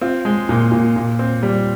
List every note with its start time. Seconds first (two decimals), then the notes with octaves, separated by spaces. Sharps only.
0.01 C4 F4
0.25 G#3
0.49 A#2
0.72 A#2
0.96 A#2
1.19 C4
1.43 G3